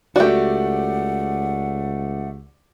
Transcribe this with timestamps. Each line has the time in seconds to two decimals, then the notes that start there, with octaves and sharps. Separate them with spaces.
0.16 C#2 A3 F#4 G4 D5 F#5